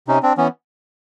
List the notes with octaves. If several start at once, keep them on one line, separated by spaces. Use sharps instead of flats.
C3 C#4 D#4
C4 D4
E3 B3 C#4